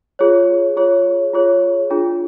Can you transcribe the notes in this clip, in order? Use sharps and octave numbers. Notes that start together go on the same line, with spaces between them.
F4 G#4 C#5
F4 G#4 C#5
F4 G#4 C#5
D4 F4 G#4